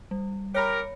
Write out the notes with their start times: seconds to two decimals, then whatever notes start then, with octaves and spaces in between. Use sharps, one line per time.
0.11 G3
0.55 G4 A#4 C#5 B5 C#7